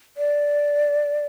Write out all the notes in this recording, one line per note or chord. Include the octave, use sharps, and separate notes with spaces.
D5